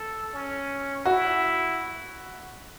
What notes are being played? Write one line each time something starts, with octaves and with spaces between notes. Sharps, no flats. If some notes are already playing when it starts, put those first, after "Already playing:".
Already playing: A4
C#4
E4 F#4